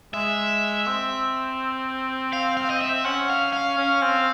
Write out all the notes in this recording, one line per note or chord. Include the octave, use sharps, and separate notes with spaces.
G#3 E5
C4
F5
F5
D#5
E5
C#4 F#5
F5
F5
C#4
C4